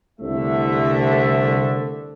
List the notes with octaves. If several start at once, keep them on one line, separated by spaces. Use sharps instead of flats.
C2 D3 A3 E5